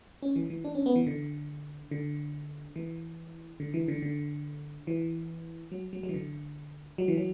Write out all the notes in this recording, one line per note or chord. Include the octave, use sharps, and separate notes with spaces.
C#4
E3
E3
D4
C#4
B3
E3
D3
D3
E3
D3
E3
D3
D3
E3
F#3
F#3
F#3
E3
D3
F#3
E3
F#3